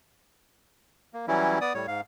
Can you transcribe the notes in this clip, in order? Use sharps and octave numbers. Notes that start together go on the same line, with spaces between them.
A#3
E3 F#3 G3 C#4 E4
B3 D5 D#6
A2 G3 C#5
G#2 F5